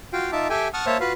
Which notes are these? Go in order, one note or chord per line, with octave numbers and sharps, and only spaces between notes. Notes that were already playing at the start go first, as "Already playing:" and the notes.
F4 F#4 F5 G5
D#4 F4 E5 A5 D6
G4 A4 E5 G5 G#5
F#5 A5 C#6 D#6 F6
A#3 C5 C#5 E5 A5
F4 F#4 B4 F5